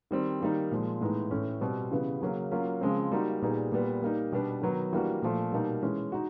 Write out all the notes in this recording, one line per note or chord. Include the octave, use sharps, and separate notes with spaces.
D#3 G3 C4
D#3 G3 A#3 D#4
A#2 F3 G#3
A2 E3 G#3 B3 D#4
A2 E3 A3 C#4
B2 G3 C4
C#3 E3 G3 B3
C#3 F#3 A#3 C#4
F#3 A#3 C#4 F4
C#3 F3 G#3 C4
G3 A#3 D#4 F#4
A#2 G3 B3 D#4 G#4
A#2 G3 B3
G3 A#3 D#4
B2 G3 B3 D4
D#3 F#3 B3 D#4
E3 G3 A#3 D4 F#4
A#2 F3 A3
B2 G3 A#3 D#4
E3 G#3 C#4
D#4 F#4